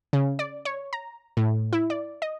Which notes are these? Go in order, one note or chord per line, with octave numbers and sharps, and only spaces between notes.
C#3
D5
C#5
A#5
A2
E4
D5
D#5